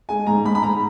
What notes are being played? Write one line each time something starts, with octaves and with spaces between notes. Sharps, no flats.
G#3 G#5
G#2 A#5
G#2 B5
B5
G#2 A#5